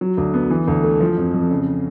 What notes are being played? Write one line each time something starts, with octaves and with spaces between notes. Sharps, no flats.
F#3
D2
B3
E3
D2
A3
F3
F2
F2
C#3